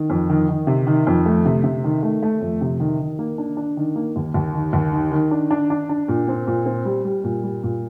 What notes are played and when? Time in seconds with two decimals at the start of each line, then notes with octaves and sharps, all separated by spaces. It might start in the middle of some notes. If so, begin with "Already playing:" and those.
Already playing: D#3
0.10 F2
0.30 D#3
0.49 D#3
0.67 C3
0.87 D#3
1.07 F2
1.26 A3
1.45 C3
1.64 C3
1.84 D#3
2.03 A3
2.22 A3
2.41 F2
2.61 C3
2.80 D#3
3.00 D#3
3.19 A#3
3.38 D4
3.57 D4
3.77 D#3
3.96 A#3
4.16 D#2
4.34 D#2
4.55 D#3
4.73 D#2
4.93 D#3
5.11 D#3
5.31 D4
5.51 D4
5.70 D4
5.89 D4
6.08 A#2
6.28 C4
6.47 A#2
6.66 C4
6.85 G3
7.05 G3
7.24 A#2
7.43 G3
7.63 A#2